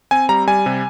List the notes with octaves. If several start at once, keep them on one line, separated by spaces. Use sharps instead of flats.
C4 G#5
G3 A#5
G3 G#5
C3